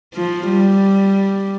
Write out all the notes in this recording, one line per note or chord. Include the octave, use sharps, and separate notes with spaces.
F3
G3